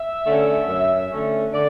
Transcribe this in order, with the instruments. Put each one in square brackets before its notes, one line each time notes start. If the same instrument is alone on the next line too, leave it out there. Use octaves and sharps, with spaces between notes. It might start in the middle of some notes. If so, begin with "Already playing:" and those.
Already playing: [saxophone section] E5
D3 A3 C#4
F#2
D3 A3 C#4
D3 D5